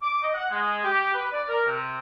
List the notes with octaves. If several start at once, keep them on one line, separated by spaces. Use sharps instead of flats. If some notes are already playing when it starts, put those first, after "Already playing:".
D6
D#5
F#5
G#3
G4
B4
D5
A#4
C3